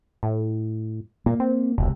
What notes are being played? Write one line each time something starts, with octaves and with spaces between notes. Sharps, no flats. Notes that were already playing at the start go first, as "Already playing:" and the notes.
A2
A#2 A#3
C4
E1 C#2 C3